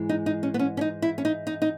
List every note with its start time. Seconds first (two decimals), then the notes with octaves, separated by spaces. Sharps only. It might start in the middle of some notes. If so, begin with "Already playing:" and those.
Already playing: G#2 E3 G#3
0.09 D#4
0.26 D#4
0.43 C#4
0.54 B3
0.59 C#4
0.77 C#4
0.81 D#4
1.02 E4
1.18 C#4
1.25 D#4
1.47 D#4
1.62 D#4